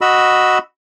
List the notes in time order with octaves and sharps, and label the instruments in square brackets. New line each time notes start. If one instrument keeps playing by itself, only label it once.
[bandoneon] F#4 D#5 B5 E6